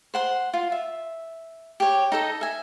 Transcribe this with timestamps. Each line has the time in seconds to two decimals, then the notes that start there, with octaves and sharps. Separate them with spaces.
0.14 C5 F#5 C6
0.54 F4
0.72 E5
1.80 G4 C#5
2.12 D#4 A4 D#5
2.41 E5 G#5